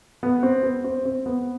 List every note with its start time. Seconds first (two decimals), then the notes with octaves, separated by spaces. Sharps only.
0.23 B3
0.43 C4
0.63 B3
0.84 C4
1.05 C4
1.26 B3